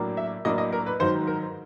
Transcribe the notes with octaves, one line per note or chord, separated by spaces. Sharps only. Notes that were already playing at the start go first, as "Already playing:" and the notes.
Already playing: A2 F#3 A#3 D4
E5
A2 F#3 A#3 D4 D#5
D#5
A#4
B4
G#2 D#3 F#3 C5
A#4